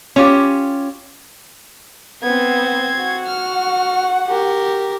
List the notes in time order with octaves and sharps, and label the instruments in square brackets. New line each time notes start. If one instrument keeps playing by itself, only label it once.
[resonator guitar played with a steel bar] C#4 F4 G4
[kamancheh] B3 C5 [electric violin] C4 G#6
[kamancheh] F#4 F#5
[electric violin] F6
G4 A#4